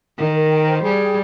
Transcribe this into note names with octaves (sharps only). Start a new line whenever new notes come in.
D#3 A#4
A#4
G5
C5
G3 G#4
G5